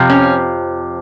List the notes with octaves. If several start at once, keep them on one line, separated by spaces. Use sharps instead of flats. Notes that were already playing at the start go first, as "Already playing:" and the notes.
Already playing: F2 C3 F3
C#4